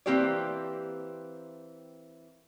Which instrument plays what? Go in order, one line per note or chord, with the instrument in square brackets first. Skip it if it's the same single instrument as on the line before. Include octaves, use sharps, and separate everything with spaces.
[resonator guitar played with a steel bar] E3 A#3 C4 G4 C5 D5